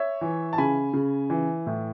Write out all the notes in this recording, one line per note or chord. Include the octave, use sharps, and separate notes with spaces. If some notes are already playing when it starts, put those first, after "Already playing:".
Already playing: C#5 E5
E3
A5
C#3 G#5 B5
C#3
E3
A2